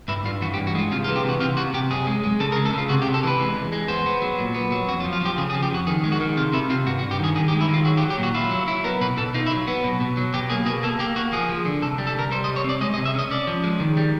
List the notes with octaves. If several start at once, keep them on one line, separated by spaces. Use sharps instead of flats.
G2 E4
G2 F4
E3 F#4
G4
G2
F#4
G#3 F4
C3 F4
F4
E3
G4
C3 F#4
C3 F4
C3 F#4
C3 G4
F#2 G#4
G#3
G#3
C#3 A4
A#4
G#3
A4
C#3 F4
C3 F#4
G4
C3
A4
E3 B4
G#3
E2
G#3
B3 C5
B3
F#3
A#2
B3
F#3
F2 F#4
F4
F3
F4
F3 G4
C#3 G#4
G#4
F3
G4
F2 F#4
D#3 G#4
G#3
F#4
D#3
C3 F4
C3 E4
C3 F4
G2 F#4
F#4
G2
G4
D#3 G#4
D#3 G#4
G4
G#3
E4
D#3
F4
F#3 F#4
G4
F#3
G4
A#2 F#4
E4 F4
F#3
E4
B3 A#4
B2 B4
B2 A4
D#4 F4
E4
F#3
B3
B2
B2
F#3
B2 G4
A#3 G#4
B2 G#4
A#3 A4
A#3 G4
A#3 F#4
F3 G#4
F3
D3
C2 A4
G3
A4
C2 A#4
G3 C5
D#5
C2
C#5
C4 D5
G#3 D#5
D#5
C3
E5
C#4 D#5
C#4 D5
F3
G#3
D#3
G3